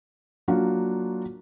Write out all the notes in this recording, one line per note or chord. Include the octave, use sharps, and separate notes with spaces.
F#3 A#3 D4 F4 F#4